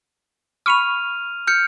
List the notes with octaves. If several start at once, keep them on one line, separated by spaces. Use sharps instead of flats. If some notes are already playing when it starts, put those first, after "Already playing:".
B5 C#6 F6 D#7 F7
F6 G6 C#7